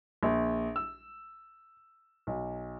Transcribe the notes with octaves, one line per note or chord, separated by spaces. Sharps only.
A#1
E6
B1